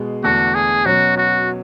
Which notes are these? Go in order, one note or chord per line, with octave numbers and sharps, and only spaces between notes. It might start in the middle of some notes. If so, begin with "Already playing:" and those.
Already playing: B2 G#3
E2 D3 A3 D4 F#4 A4
G#4
B2 F#3 C#4 F#4
F#4